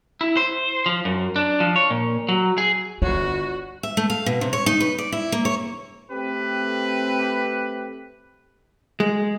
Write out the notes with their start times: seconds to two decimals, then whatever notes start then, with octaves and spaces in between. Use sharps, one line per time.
0.21 E4
0.37 C5
0.86 F3
1.05 F#2
1.36 D4
1.60 F3
1.76 C#5
1.90 A#2
2.29 F#3
2.58 G#4
3.02 G1 F4 F#4 C#5
3.83 E5
3.97 A3
4.10 F5
4.26 B2
4.41 C3
4.53 C#5
4.66 D#4
4.80 B4
4.98 D5
5.12 E4
5.32 A#3
5.45 C#5
6.11 A3 C4 G4 B4
9.00 G#3